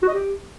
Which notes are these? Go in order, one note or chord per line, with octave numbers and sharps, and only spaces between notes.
F#4
D#5
G4